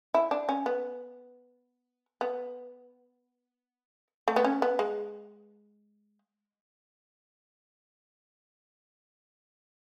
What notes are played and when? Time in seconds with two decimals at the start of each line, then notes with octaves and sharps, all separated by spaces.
0.14 E4
0.31 D4
0.49 C#4
0.66 B3
2.21 B3
4.28 A3
4.36 B3
4.44 C#4
4.62 B3
4.79 G#3